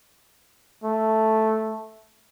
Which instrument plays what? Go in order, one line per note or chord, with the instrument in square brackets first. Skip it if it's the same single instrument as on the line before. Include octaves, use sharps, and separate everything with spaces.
[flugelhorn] A3